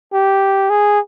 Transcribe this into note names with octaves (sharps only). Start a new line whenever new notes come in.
G4
G#4